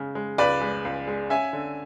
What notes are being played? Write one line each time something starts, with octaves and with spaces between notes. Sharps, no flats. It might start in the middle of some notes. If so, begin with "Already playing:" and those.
Already playing: C#3 G#3
G#3
C#2 B4 D5
G#3
C#2
G#3
C#4 E5 G#5
D3